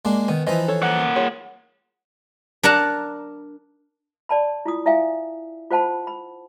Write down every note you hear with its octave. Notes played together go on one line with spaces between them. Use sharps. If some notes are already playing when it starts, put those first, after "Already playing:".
G#3 A#3 D4
D#3 B3
E3 F3 D#4 E4 B4 D#5
A4 C#5
A#3 F#5
F4 G#4 C#5
D4 A#4 F#5 A5 A#5
D5 A5 B5
E4 F4 D#6
E4 E5 F5 G#5
F4 C5 F#5 A5 B5
B5